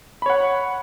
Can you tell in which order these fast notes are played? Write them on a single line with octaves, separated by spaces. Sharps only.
B5 C#5 F#5